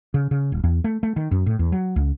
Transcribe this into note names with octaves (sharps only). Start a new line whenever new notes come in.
C#3
C#3
D#1
E2
A3
A3
D#3
F#2
A2
E2
F#3
C#2